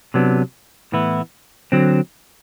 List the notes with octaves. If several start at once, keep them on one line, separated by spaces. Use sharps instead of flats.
C3 F#3 B3 D4
A2 E3 B3 E4
D3 F#3 C4